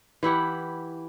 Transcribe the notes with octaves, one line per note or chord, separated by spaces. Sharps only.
E3 E4 G4 F#5